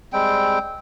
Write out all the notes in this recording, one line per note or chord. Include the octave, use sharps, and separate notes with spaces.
G3 G#3 C4 G5